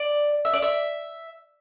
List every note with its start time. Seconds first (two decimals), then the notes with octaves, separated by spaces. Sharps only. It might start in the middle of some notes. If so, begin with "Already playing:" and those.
Already playing: D5
0.45 E5
0.54 D5
0.63 E5